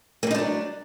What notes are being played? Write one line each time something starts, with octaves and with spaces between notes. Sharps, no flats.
F#3 G3 A#3 D4 D#4